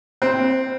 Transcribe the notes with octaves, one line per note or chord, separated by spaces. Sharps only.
C4